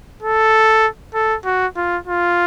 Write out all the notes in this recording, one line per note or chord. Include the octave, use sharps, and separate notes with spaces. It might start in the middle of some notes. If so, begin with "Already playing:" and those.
A4
A4
F#4
F4
F4